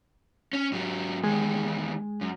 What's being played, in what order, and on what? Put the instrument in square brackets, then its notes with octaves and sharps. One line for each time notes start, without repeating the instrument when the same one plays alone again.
[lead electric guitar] C#4
G#2 F#3
[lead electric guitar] E2 D#3 [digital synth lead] G#3
[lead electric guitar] F#2